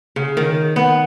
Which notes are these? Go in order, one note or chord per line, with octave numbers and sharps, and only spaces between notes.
C#3
D#3
B3